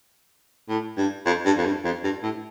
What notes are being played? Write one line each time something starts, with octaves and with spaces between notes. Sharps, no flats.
A2
G2
F2
G2
F2
G2
F2
G2
A2